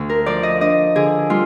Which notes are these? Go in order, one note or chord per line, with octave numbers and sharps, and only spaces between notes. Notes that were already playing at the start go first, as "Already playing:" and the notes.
Already playing: D2
A#4
F3 D5
D#5
D4 D#5
D3 G#4
G3 F4